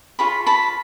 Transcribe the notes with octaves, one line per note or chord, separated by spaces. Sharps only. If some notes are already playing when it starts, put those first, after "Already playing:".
F4 G#4 C#5 A5 B5
A5 B5